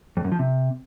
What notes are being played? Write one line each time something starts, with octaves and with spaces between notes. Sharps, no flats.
F2
F#2
F3
C3